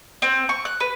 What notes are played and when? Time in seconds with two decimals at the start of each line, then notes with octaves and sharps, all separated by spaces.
0.22 C4
0.49 C#6
0.65 F#6
0.80 B4